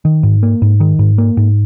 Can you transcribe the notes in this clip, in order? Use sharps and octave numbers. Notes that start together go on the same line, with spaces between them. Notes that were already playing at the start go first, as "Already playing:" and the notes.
D#3
G#2
A#3
G#2
D#3
G#2
A#3
G#2